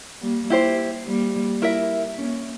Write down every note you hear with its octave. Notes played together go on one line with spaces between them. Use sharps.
G3 A#3
E4 G4 C5
G3 A#3
E4 A#4 E5
A#3 C#4